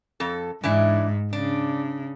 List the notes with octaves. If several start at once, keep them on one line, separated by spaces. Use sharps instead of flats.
F2 A4
G#2 E3 D4 E4
C#3 D4